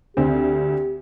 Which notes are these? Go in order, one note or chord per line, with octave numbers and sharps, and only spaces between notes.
D2 C4 G4